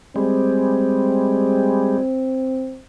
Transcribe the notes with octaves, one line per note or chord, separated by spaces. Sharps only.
G3 G#3 C4